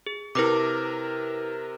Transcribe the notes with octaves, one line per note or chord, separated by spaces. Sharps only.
G#4
C3 E4 A#4 B4 D6